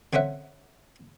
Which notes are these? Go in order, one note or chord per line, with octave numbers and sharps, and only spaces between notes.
D3 C4 C#4 E5 F#5